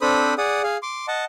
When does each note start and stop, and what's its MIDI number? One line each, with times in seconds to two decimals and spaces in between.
0.01 0.34 60
0.01 0.34 62
0.01 0.34 69
0.01 0.34 72
0.01 0.34 83
0.01 0.34 87
0.38 0.62 68
0.38 0.62 74
0.38 0.62 78
0.38 0.62 87
0.64 0.77 68
0.64 0.77 77
0.83 1.06 84
0.83 1.06 86
1.08 1.25 75
1.08 1.25 78
1.08 1.25 81